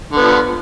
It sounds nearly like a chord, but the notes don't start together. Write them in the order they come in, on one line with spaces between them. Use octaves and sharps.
D3 B3 F3